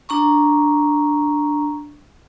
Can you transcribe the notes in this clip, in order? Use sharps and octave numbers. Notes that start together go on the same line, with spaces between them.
D4 A#5 C#6